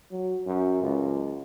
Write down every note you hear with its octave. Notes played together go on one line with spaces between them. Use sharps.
F#3
F#2
C#2